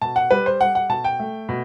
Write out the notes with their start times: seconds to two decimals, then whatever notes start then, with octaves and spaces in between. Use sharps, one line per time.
0.02 B2 A5
0.16 F#5
0.31 G3 B4
0.46 C5
0.60 G3 F#5
0.75 F#5
0.89 B2 A5
1.04 G5
1.20 A3
1.49 B2